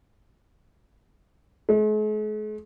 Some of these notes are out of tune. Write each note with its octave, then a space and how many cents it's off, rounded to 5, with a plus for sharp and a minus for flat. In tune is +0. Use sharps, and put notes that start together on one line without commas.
G#3 +45